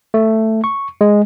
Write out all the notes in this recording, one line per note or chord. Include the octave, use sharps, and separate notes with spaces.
A3
C#6
G#3